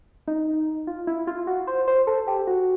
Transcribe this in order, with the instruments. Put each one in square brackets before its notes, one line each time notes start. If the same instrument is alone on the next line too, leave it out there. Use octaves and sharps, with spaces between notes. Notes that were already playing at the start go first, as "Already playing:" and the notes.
[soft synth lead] D#4
F4
E4
F4
F#4
C5
C5
A4
G4
F#4